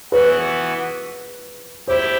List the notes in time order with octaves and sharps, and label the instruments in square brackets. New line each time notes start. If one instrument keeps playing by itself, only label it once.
[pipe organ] E3 B3 F#4 [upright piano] B4
[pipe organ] E4 G4 [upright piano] C5